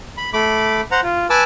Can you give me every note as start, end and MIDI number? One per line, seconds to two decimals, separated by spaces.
0.17 0.30 83
0.33 0.81 57
0.33 0.81 83
0.33 0.81 86
0.91 1.00 72
0.91 1.00 78
0.91 1.00 82
1.03 1.26 65
1.30 1.44 71
1.30 1.44 80
1.30 1.44 81
1.30 1.44 86
1.30 1.44 88